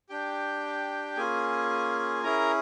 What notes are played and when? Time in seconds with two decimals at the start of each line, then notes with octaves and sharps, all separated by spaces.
0.10 D4 G4 G5
1.17 A#3 C#4 F4 G#4 G#5
2.23 C#4 E4 G#4 A#4 A#5